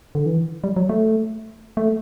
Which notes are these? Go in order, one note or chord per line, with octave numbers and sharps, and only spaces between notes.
D3
E3
G3
F#3
A3
A3